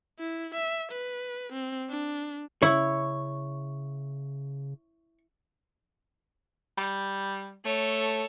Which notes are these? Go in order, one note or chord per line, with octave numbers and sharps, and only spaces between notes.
E4
E5
B4
C4
D4
C#3 E4 C#5
G3
A3 A4 C#5